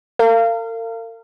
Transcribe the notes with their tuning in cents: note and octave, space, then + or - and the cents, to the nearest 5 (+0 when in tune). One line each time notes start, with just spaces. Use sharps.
A#4 -45 F5 -25